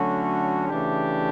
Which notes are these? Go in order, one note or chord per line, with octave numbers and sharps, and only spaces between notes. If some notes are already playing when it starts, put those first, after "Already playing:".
Already playing: D3 F#3 A3 C#4 F#4
C#3 E3 A3 D4 G4